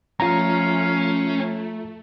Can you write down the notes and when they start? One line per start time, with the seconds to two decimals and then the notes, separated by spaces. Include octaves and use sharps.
0.20 F3 A3 C#4 F4 F5 A#5